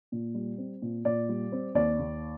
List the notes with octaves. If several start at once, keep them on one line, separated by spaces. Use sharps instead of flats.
A#2
G3
C4
A#2
A#2 D5
G3
C4
D#2 D5
D#2